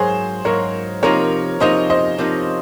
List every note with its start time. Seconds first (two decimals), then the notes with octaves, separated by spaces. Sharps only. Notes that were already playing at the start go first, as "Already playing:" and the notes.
Already playing: G#2 F#3 A#3 G#4 C5
0.45 G#2 F#3 A#3 A#4 C#5
1.03 C3 F3 A#3 D#4 A#4 C#5
1.60 C3 F3 A#3 D#4 C5 D#5
1.90 C5 D#5
2.18 C3 F3 A#3 D#4